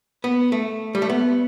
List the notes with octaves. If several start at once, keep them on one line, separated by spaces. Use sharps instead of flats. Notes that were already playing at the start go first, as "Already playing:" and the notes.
B3
A3
G3
A3
B3